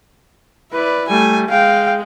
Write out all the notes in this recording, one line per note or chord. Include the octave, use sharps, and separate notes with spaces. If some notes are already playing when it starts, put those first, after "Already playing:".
E4 B4 D5
G3 A3 G#5
G#3 F5 G5